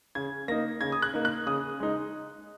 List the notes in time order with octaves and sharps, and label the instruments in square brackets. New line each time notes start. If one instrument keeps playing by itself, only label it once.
[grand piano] C#3 G#6
A#3 D#4 A#6
C#3 G#6
D#6
F#6
A#3 D#4
F#6
C#3 D#6
G#3 D#4